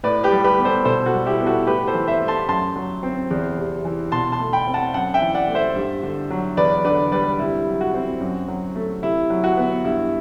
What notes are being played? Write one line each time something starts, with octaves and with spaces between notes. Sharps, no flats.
A2 B4 D5
G4 B4
G3
G4 B4
B3
A4 C5
B2 A4 C5
F#4 A4
G3
E4 G4
B3
F#4 A4
A2 G4 B4
A4 C5
E3
C5 E5
A3
A5 C6
F#2 A5 C6
F#3
C4
E2
C3
E3
B2 A5 C6
A5 C6
A3
G5 B5
C4
F#5 A5
F#2 F#5 A5
E5 G5
E3
D5 F#5
A3
C5 E5
G2
D3
F#3
E2 B4 D5
D3 B4 D5
G3 B4 D5
C3 E4
F#3
F#4
C4
F#2
F#3
A3
C3 E4
F#3
F#4
B3
G2 E4